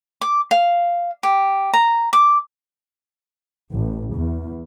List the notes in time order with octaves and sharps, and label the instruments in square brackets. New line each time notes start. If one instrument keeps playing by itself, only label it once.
[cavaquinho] D6
F5
G4
A#5
D6
[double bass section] A1
E2